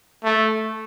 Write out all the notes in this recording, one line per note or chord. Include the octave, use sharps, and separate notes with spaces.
A3